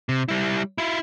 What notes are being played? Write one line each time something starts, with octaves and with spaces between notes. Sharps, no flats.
C3
G3 E4
E4 F4